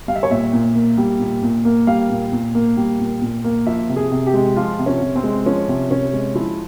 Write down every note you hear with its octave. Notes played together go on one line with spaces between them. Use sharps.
G3 F5
E5
C#5
A#2 E5
A#2
A#3
G3
A#2
A#2
A#3
G3 F5
A#2
A#2
A#3
G3
A#2
A#2
A#3
F3 E5
C3
G#4
C3
G4
G#3
F3 F4
C3
C#4
C3
C4
G#3
F3 C#4
C3
C3 C#4
G#3
F3 E4